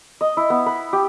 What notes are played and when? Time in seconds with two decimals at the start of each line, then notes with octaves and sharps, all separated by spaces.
0.21 D#5
0.37 E4
0.50 B3
0.66 B4
0.93 G4